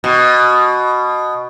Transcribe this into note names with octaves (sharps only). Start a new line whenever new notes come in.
B2